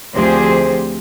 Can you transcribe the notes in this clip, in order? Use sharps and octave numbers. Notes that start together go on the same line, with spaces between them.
D2 F3 C4 G4 G#4 C5